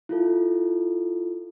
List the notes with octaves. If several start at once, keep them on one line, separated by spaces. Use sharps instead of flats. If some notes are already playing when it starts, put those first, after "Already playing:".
E4 F4 A4